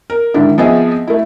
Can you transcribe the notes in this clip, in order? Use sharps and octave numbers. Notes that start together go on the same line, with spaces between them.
A#4
G#2 D3 D#3 D4 E4
F3 B3 C4 G#4 D#5 E5
A3 E4